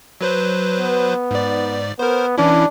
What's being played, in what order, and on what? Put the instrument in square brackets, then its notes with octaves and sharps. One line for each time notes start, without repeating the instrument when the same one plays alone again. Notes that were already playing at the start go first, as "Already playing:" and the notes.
[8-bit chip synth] F#3 B4 C5
[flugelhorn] B3
[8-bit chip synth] G#2 D5
[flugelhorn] B3 [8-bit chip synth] A#4 C5
[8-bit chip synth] E3 C#4 E4 [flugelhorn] D4